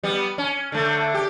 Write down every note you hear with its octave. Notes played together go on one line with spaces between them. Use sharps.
G3 B3
C#4
D3 A3
G4